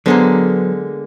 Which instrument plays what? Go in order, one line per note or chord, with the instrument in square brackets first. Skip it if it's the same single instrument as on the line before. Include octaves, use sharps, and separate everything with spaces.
[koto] D3 G#3 A#3 [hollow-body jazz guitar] F#3 B3 C5